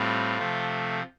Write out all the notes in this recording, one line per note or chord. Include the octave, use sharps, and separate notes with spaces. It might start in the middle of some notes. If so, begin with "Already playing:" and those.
Already playing: A2 G3 C4 F4
C3 F3 A3